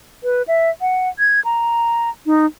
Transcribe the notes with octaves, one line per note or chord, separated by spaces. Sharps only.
B4
E5
F#5
G#6
A#5
D#4